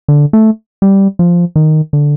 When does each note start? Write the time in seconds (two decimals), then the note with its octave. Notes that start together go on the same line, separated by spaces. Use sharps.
0.08 D3
0.33 A3
0.82 G3
1.19 F3
1.56 D#3
1.93 D3